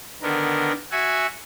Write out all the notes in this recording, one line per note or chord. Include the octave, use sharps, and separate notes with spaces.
D3 D#3 B3 A#4
F#4 E5 F#5 G#5